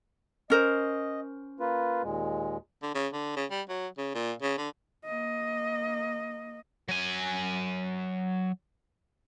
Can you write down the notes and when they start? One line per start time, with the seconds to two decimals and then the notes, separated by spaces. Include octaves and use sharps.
0.50 C#4 A#4 C5 D#5
1.60 A#3 F4 B4
2.03 D#2 A#2 G#3
2.82 D3
2.95 C#3
3.13 D3
3.36 C#3
3.51 G3
3.69 F#3
3.98 C#3
4.15 A#2
4.42 C#3
4.58 D3
5.06 A#3 D#5
6.88 F#3 G#5